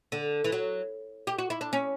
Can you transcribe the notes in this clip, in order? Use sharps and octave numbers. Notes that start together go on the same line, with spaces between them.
D3
E3
F#3
G4
F#4
E4
D4
C#4